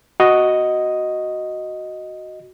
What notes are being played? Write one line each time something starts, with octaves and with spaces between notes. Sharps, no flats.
F#4 D#5